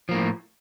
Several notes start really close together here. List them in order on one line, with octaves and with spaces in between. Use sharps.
F3 A#3 A2